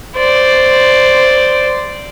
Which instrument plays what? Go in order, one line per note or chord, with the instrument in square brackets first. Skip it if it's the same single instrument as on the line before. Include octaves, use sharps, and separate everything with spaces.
[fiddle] C5 D5